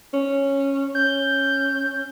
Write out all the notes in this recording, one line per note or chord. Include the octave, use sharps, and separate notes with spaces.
C#4
C#4 G6